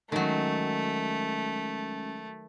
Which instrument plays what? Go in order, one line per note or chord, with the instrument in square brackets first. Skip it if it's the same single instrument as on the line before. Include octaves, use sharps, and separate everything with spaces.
[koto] D#3 F#3 [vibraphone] G#3 C#4 [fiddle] A3